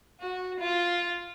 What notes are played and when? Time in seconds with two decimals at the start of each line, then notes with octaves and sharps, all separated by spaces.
0.20 F#4
0.60 F4